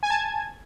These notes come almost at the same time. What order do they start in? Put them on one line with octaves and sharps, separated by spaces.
G#5 G#6 A5